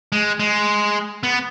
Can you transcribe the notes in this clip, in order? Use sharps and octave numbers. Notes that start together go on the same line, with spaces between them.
G#3
G#3
B3